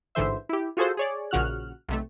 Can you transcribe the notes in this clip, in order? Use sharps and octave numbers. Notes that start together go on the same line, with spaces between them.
A1 G#2 D3 E3 C5 E5
E4 G4
F4 F#4 G#4 A4 C5
G#4 C#5 D5
A#1 A#2 C#3 F#4 F6 F#6
B1 C3 A3